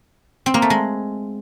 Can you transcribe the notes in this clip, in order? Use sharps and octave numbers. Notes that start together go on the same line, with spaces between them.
C4
A#3
A3
G#3